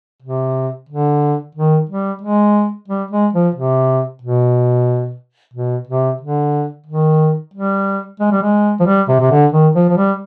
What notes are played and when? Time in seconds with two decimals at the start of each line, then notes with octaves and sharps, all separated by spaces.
0.22 C3
0.90 D3
1.55 D#3
1.89 G3
2.22 G#3
2.88 G3
3.11 G#3
3.33 F3
3.55 C3
4.22 B2
5.54 B2
5.87 C3
6.21 D3
6.86 D#3
7.54 G3
8.20 G#3
8.31 G3
8.42 G#3
8.80 F3
8.86 G3
9.08 C3
9.20 C3
9.31 D3
9.52 D#3
9.75 F3
9.89 F3
9.97 G3